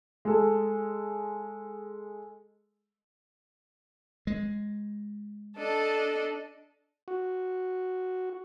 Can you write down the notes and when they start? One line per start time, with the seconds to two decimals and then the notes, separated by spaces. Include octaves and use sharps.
0.25 G#3 A4
4.27 G#3
5.57 D4 A4 D#5
7.08 F#4